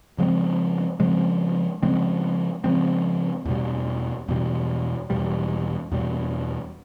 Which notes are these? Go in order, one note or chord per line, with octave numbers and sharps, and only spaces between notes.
C#3 F3 G#3 C4
C#3 F3 G#3 C4
C#3 F3 G#3 C4
C#3 F3 G#3 C4
E2 B2 G3
E2 B2 G3
E2 B2 G3
E2 B2 G3